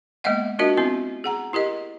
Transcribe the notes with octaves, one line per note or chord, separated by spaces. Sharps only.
G#3 A#3 B3 D#5 E5 F#5
D4 F4 F#4 A#4 D#5 E5
B3 C4 E4 E5
G#4 F#5 A#5
E4 G4 A#4 D#5